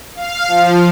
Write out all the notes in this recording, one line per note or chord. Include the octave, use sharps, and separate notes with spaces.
F5
F3